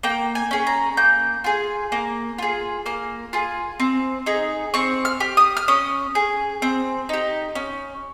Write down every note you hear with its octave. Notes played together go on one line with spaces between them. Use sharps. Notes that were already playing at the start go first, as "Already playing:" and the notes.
A#3 G5
G#5
C#4 G#4
A#5
A#3 G6
F4 G#4
A#3
F4 G#4
A#3 F6
F4 G#4
C4
D#4 G#4
C4 C#6
F6
G4
D#6
F6
C#4 D#6
G#4
C4
D#4 G4
C#4